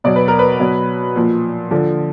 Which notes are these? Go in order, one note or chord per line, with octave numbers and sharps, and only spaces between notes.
B2 F#3 D5
B4
A#4
B4
B2 F#3
A#2 F3
D3 F3